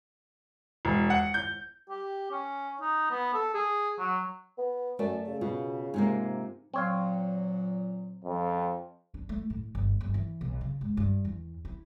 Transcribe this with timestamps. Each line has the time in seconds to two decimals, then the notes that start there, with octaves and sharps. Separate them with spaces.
0.85 E1
1.10 F#5
1.34 G6
1.90 G4
2.31 C#4
2.81 D#4
3.11 B3
3.34 A4
3.54 G#4
3.99 F#3
4.58 B3
4.99 F#2 A3 D5 A5
5.28 C#3
5.41 B2 F4
5.94 G#2 C3 A#3
6.74 A#2 F#3 C4 C#5 F5
8.25 F2
9.14 D4
9.29 A3
9.50 A2
9.75 G1
10.01 G1
10.14 E3
10.41 B1
10.61 C#3
10.81 G#2
10.97 G2
11.25 E2
11.65 E4